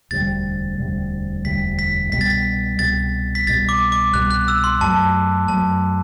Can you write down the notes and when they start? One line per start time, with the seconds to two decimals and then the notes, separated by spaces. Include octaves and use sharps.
0.11 E1 D2 C3 G3 A6
0.78 E1 D2 C3 G3
1.45 E1 D2 C3 G3 B6
1.79 B6
2.12 C2 B2 G3 B6
2.21 A6
2.30 B6
2.79 C2 B2 G3 A6
3.35 B6
3.47 C2 B2 G3 A6
3.69 D6
3.92 D6
4.14 C2 B2 G3 F#6
4.31 F#6
4.48 E6
4.64 C6
4.81 F#2 F#3 A3 A5
5.48 F#2 F#3 A3 A5